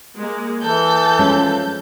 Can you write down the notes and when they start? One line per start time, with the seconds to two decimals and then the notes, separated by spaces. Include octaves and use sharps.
0.18 G#3 A#3
0.63 E3 A4 G6
1.19 F3 G#3 C#4